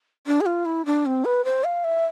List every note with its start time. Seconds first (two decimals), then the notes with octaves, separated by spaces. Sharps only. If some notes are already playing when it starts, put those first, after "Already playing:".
0.27 D4
0.41 G#4
0.46 F4
0.65 E4
0.86 D4
1.06 C4
1.25 B4
1.45 C5
1.64 F5
1.84 E5